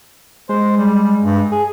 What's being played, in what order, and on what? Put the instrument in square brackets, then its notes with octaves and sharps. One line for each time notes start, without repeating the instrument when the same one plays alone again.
[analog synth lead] G#3 [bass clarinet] C5
[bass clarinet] G3
G2
G#4